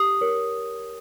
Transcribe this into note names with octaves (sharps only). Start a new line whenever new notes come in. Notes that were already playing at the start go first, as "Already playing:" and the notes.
Already playing: G4 D#6
A#4 C#5